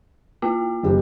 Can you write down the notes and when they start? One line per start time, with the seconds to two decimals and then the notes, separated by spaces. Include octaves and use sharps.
0.42 A#3 F4
0.83 F#1 G4